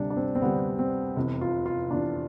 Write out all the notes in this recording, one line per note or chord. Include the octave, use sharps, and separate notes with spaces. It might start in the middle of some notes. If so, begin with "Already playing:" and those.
Already playing: D2 C3 G3 D4
D4
C4
C4
D2 C3 G3 B3
C4
F1 E2 C3
F4
F4
F1 E2 C3 D4